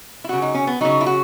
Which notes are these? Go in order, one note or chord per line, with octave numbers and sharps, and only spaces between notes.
E4
C#3 F#3 F#4
D#4
C#4
B3
C#3 F#3 D#4
E4
F#4